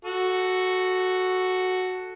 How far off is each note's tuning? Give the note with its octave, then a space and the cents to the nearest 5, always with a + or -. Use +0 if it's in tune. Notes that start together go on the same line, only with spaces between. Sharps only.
F#4 +0 A4 +0 C#6 +0